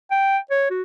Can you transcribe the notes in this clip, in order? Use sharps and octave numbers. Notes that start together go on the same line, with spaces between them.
G5
C#5
F#4